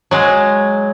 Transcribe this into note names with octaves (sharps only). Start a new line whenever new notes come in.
F#3 G#3